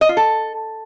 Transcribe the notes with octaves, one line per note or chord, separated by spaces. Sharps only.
D#5
F4
A4